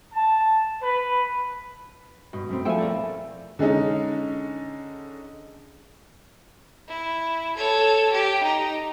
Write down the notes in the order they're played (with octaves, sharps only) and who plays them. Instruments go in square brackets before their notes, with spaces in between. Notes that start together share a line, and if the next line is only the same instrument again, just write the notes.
[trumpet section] A5
B4
[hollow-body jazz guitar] G2 [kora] B2
[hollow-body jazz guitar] F#2 A3 C4
[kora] F3 A3 E4 [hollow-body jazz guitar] G5 G#5
[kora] A4 [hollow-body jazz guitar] A#4 D5 F5
[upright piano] D3 G#3 C#4 D#4
[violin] E4
A4 C#5
G4
D#4